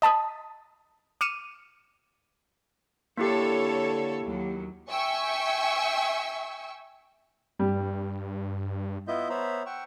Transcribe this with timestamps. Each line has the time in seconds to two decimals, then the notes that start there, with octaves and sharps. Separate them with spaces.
0.02 D#5 A5 B5 D#6
1.21 D6 F6 C#7 D#7 E7
3.17 D3 A#3 E4 G4 A4 C#5
4.22 D#2 F#3
4.90 E5 G5 G#5 C#6 E6
7.59 G2 G3
9.08 B3 E4 F4 D#5 E5 G6
9.30 B3 C5 C#5 E5 A#5 B5
9.66 F#5 G5 C#6 E6